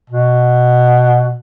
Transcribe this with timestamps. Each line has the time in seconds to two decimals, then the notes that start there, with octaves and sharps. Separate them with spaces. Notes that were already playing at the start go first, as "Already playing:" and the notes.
0.10 B2